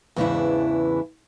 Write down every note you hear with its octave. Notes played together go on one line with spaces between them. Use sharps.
E2 G#2 C#3 E3 D4 E4